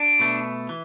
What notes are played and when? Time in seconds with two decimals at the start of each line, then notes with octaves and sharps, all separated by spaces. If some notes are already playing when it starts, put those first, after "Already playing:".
Already playing: D4
0.19 B2 A3
0.69 E3